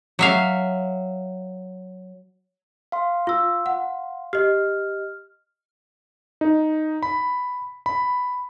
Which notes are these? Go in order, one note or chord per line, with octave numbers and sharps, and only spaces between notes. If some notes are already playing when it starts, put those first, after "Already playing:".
F#3 E5 F5
F5 C6
F4 E6
F#5
G4 D#5 F6
D#4
B5
B5